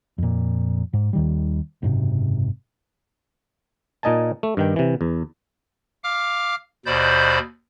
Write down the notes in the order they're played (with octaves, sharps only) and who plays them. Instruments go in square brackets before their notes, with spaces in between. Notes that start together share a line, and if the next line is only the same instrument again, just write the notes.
[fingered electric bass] F2 A#2
G#2
D#2 D#3 G3
F#1 G#2 C3
[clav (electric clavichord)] A#2 D#4 D#5 G#5 A5
A3
G2 D#3 G5
C3 E3
E2
[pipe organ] F5 D6 F6
D#2 B2 C5 D5 B5 G6